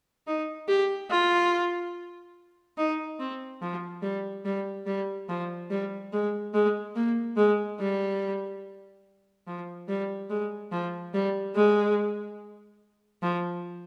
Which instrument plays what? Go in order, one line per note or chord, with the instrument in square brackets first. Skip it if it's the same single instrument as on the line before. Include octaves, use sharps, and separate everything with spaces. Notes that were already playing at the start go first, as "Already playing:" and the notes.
[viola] D#4
G4
F4
D#4
C4
F3
G3
G3
G3
F3
G3
G#3
G#3
A#3
G#3
G3
F3
G3
G#3
F3
G3
G#3
F3